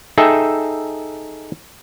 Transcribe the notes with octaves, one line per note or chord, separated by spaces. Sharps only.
D#4 G#4 A4 E5 G5